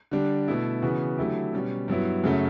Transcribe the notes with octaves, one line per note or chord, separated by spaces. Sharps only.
D3 G3 D4
B2 A3 E4
C#3 E3 B3 F#4
D3 F#3 A3 E4 G4
B2 G3 C#4
G2 F#3 B3 E4
F#2 C#3 F#3 A3 C#4